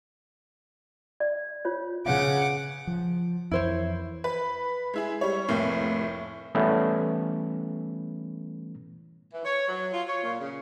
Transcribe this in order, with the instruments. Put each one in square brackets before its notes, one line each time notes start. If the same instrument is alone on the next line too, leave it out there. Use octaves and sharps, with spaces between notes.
[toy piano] D5
F4 C5 C#5
[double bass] C#3 [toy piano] B4 C#5 F5 [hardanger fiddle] F#5 D6
[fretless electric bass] F3
[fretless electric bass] F2 E3 [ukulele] E4 C5 C#5
[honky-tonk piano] B4
G#3 E4 G#4
G3 C#5
F1 A2 A#3 C4
[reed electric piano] E3 G3 A3 B3 C#4 E4
[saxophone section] E3
C#5
F#3
F4
C#5
A#2
C#3